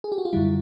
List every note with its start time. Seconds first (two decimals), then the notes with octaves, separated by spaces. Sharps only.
0.04 G#4
0.12 G4
0.18 F#4
0.25 F4
0.33 F#2 D3 G3 E4